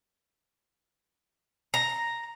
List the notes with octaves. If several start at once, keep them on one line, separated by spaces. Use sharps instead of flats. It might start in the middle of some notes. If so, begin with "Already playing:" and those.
A#5